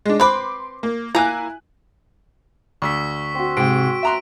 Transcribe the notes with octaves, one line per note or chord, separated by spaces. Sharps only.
G#3 D4
C4 B4 C6 D6
A#3
A#3 E4 G#5 A#5 F#6
D2 C#6 E6 B6
C4 F#4
G#2 C3 G5 D7
E5 A#5 C6 F#6